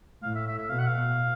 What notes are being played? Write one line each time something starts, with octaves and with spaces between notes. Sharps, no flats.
A2 F5
E5
E5
E5
B2 F5
F#5
F5